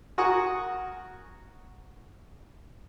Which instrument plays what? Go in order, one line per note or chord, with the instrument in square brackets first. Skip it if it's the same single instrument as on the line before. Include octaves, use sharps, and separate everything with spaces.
[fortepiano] F#4 A#4 F#5 G#5 C#6 D#6